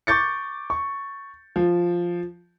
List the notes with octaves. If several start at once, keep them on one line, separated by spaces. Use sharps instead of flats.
C#6 D6 G6 A6 C#7
C#6
F3